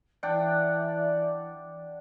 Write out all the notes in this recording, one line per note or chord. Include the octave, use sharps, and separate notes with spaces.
E3 D4 D5 F#5 G5